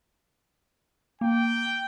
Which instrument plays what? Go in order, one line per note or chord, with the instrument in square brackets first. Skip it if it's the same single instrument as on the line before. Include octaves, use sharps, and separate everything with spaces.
[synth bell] A#3 [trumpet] G5